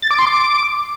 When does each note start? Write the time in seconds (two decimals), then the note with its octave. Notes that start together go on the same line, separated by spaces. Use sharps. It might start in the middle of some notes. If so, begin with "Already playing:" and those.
0.02 A6
0.11 D6
0.19 C6
0.27 D6